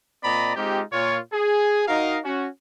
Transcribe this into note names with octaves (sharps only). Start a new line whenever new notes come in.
A#2 C4 D5 D#5 A#5 B5
G#3 C4 D#4 F4 G4
A#2 F4 C#5
G#4
D#4 F#4 A#4 D#5 F5
C#4 F#4